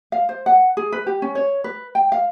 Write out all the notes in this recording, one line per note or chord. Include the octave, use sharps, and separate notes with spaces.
F5
C5
F#5
G#4
B4
G4
C#4
C#5
B4
G5
F5